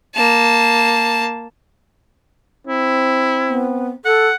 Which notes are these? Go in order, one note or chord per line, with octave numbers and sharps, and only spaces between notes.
A#3 A5
C4 E4
B3
A4 F#5